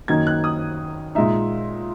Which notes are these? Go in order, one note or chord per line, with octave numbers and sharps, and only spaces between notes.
F#2 D#3 A#3 D#4 G#6
F#6
D#6
A#2 G#3 D#4 E5